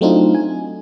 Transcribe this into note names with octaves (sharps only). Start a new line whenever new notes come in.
F#3 A3 C4 D4 D#4 F4
G#5